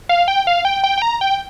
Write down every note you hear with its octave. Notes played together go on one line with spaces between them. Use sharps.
F5
G5
F5
G5
G5
G5
A#5
G5